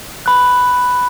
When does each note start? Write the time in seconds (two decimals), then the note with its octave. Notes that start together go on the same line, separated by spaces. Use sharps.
0.26 B5 F#6